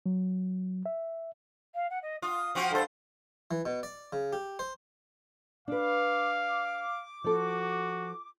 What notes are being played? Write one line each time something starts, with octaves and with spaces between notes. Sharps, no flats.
F#3
E5
F5
F#5
D#5
F4 D#6
F3 C4 F#4
G2 A4 C5
E3
B2
D5
C#3
G4
C5
D4 B4 F5 D6
F3 F#4 A4